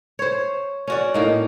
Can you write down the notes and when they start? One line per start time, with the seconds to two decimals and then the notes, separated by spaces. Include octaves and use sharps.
0.19 C5 C#5
0.87 C#4 F#4 D5
1.14 A2 A#3 D#4